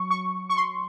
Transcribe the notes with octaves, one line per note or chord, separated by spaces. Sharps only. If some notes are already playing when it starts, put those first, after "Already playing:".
Already playing: F#3 C#6
C#6
C#6
C6